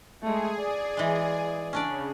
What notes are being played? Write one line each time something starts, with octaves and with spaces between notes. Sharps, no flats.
G#3 A3 G#4
D5
E3 G#3
C#3 C#4 D4 D5